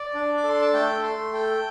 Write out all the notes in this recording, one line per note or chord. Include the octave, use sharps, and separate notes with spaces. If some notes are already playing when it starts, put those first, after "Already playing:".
Already playing: D5
D4
D6
A4 C6
A5
A3 G5
A3 C6
A4 G5